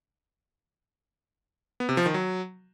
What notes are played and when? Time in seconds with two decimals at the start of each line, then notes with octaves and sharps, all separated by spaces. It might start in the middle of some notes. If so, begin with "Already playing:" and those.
1.80 B3
1.89 C3
1.97 F3
2.06 D#3
2.14 F#3